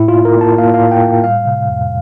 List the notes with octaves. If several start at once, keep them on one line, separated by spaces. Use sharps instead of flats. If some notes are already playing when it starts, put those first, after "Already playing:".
Already playing: A2 E4
A#3 F4
A#4
A#3 A5
A#3 F5
F5
A2
G5
A2
G3 F5
C3
F2